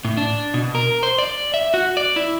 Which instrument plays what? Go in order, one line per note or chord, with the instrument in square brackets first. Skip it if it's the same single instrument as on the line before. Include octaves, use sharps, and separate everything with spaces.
[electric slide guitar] A2
D4
B2
A#4
C5
D5
E5
F#4
D5
E4